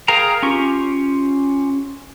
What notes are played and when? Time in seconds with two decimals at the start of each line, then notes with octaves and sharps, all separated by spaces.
0.08 G#4 A#4 F5 G5 A#5
0.43 C#4 F4 G4 C#6